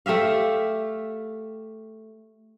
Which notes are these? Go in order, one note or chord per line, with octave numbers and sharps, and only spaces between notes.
A3 G4 E5 F5